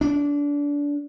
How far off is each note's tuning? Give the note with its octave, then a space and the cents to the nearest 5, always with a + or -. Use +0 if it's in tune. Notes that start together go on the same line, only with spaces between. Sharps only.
D4 -25